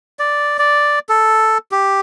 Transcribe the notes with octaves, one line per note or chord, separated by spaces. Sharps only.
D5
D5
A4
G4